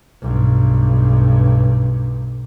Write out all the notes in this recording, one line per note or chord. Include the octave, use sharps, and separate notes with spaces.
B1 G2